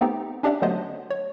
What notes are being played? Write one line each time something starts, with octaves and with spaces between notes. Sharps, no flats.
A3 B3 C4 D#4 G4
C#4 D4 G4 D5 E5 F#5
D3 F#3 A3 B3 C5 D#5
C#5